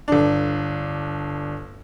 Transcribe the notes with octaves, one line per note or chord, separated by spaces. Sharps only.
G1 D4